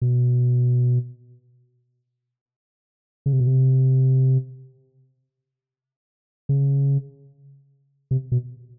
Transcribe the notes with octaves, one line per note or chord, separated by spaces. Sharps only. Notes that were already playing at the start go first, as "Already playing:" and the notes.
B2
C#3
C3
B2
C3
C#3
C3
B2